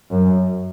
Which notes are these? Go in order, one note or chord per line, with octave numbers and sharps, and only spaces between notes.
F#2